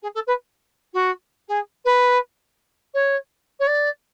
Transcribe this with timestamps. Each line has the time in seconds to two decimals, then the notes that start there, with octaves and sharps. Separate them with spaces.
0.02 G#4
0.14 A4
0.27 B4
0.93 F#4
1.48 G#4
1.85 B4
2.94 C#5
3.59 C#5
3.67 D5